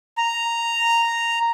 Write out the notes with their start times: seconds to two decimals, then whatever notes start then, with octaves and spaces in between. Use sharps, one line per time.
0.18 A#5